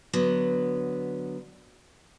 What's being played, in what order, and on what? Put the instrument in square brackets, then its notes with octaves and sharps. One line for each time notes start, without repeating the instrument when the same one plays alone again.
[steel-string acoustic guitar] D3 F#3 B3